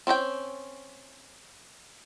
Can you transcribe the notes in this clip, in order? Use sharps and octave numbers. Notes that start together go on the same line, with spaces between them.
C4 C#4 D#4 G5